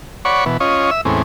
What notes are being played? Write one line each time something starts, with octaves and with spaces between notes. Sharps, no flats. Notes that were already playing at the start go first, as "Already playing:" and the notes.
C#5 D5 F#5 B5 C#6
B2 E3
C#4 F4 C#5 D#5
E5 E6
E2 A2 G#3 C4 C#4